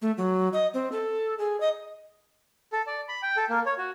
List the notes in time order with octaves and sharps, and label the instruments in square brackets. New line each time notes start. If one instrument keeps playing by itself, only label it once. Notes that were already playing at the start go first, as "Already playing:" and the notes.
[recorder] A3
F#3
D#5
C4
A4
G#4
D#5
[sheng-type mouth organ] A4
D5
B5
G5
A4
A#3
C#5
F#4